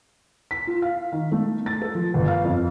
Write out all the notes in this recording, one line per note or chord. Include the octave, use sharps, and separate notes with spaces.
B6
F4
F5
D#3
A3
A6
A4
F3
G1
F5
F2